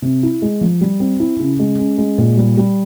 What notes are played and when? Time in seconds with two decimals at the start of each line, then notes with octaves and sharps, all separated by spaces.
0.02 C3
0.23 E4
0.42 G#3
0.61 F3
0.81 G3
1.00 C4
1.20 E4
1.40 C#3
1.59 G#3
1.78 C#4
1.98 G#3
2.18 A#2
2.37 G3
2.57 G3